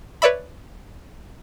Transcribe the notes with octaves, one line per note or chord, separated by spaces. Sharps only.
B4 C#5 D5 E5 B5